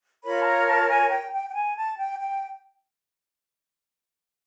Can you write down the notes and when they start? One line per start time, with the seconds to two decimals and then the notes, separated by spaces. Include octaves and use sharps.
0.23 F4 A#4 C#5 B5
0.40 A5
0.45 A#5
0.67 A5
0.89 G#5
1.10 G5
1.32 G5
1.50 G5
1.55 G#5
1.76 A5
1.98 G5
2.19 G5